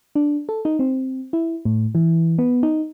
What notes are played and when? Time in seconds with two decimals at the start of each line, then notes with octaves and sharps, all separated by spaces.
0.15 D4
0.49 A4
0.65 D#4
0.79 C4
1.33 E4
1.65 A2
1.95 E3
2.39 B3
2.63 D#4